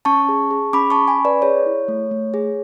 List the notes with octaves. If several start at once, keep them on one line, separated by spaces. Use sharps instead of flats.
C#4 A5 C#6
G#4
G#4
C#4 B5 D6
A5 C#6
C#4
G#5 B5
G#4
B4 D5
G#4 C#5
E4
A3
A3
G#4